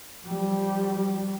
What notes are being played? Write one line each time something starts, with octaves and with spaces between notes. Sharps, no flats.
F3 G3